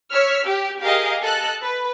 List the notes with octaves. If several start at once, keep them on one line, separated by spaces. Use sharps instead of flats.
C#5 E6 F6 B6
G4
G4 G#4 A#4 D#5 F5
A4 D#5 A5 F#6
B4